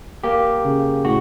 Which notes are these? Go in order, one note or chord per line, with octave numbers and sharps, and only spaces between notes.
A#3 G4
C#3
A2 F#4